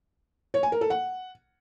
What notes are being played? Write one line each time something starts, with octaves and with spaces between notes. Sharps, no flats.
C#5
G#5
A#4
A4
F#5